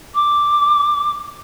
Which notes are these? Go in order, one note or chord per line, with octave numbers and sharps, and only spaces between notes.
D6